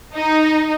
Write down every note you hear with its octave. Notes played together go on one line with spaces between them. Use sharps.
D#4